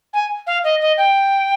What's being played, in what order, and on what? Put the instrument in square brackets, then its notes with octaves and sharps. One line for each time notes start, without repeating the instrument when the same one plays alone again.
[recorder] G#5
F5
D#5
D#5
G5